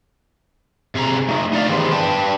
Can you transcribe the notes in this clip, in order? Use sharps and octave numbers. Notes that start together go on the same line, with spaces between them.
C3 G#4 A#5
A3 D#4
D#4 D5 F5
D#3 E3 B3 G4 G#4 C5
D4 B4 G5 A5